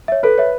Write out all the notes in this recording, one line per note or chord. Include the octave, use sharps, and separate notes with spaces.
C#5 E5
A4 B4
C#5 E5